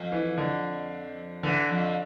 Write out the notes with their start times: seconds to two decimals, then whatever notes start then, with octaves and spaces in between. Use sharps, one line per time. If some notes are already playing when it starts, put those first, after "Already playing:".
Already playing: F2
0.12 E3
0.37 D3
1.43 D3 E3
1.69 F2